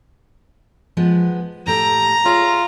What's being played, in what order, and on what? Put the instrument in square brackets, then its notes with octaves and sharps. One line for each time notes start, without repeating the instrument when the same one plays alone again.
[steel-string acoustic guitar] F3 G#3 B3
[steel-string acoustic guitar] A2 G4 A4 [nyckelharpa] A#5
[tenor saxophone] F4 [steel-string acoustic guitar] G#4 C#5 E5